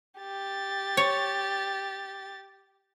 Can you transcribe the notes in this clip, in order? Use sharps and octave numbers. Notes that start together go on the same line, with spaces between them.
G4 A6
C#5